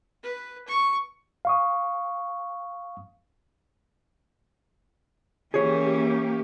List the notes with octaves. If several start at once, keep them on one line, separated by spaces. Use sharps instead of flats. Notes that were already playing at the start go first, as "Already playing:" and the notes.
B4
C#6
F5 C#6 D#6
E3 A#3 C#4 G4 G#4 C#5